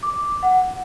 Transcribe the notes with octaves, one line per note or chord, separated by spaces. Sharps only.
D6
F#5